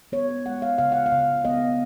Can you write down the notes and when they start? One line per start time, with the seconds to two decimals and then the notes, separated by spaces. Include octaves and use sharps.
0.12 B3 C#5
0.46 G#3 F#5
0.62 F5
0.78 C#3 F5
0.92 F#5
1.06 F5
1.12 C#3
1.45 B3 D#5